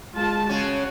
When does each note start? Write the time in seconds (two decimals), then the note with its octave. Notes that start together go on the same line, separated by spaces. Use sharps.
0.16 G#3 F4 A5
0.49 C#3 C#4 F#4